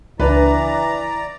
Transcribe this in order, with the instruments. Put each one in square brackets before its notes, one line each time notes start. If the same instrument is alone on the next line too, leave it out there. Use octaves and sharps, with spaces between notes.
[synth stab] C#2 D4 [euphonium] E3 [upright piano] B4 [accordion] D5 A#5